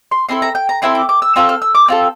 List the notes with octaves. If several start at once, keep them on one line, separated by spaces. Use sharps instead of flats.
C6
C4 E4 A4 C6
A#5
G5
A#5
C4 E4 A4 C6
D6
D6
E6
C4 F4 A4 E6
F6
E6
D6
C4 F4 A4